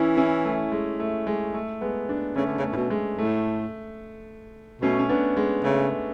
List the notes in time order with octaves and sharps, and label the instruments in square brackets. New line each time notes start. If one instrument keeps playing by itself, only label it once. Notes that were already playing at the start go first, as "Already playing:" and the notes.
Already playing: [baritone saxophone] E3 [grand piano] C#4 E4
[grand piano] C#4 E4
A3
G#3
A3
G#3
A3
G#3 B3
B3 D4
[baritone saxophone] C#3 [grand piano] A3 C#4
[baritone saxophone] D3
C#3
[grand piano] A3
[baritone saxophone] A2
B2
[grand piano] G#3
[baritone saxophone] A2 [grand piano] A3
[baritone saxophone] B2 [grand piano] A3 C#4
[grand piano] C#4
B3 D4
G#3 B3
[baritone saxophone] C#3 [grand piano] A3